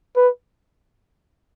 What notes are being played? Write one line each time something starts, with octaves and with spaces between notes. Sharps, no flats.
B4